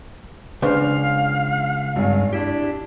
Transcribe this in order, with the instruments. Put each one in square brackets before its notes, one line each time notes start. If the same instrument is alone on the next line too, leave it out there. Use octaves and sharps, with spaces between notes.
[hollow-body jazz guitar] C#2 [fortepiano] D4 B4 C5 [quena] F5
[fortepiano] G#1 G#5 [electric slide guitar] G2
[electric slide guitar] D4 E4 G4